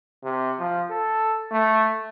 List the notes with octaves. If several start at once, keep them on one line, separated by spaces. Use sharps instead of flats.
C3
F3
A4
A3